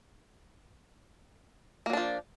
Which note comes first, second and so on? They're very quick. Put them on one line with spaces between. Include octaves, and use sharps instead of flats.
A#3 F#3 D4 F3